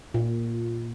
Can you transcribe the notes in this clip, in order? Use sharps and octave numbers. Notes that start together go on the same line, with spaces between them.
A#2